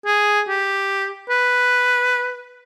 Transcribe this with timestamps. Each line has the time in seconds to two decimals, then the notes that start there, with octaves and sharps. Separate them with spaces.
0.06 G#4
0.48 G4
1.30 B4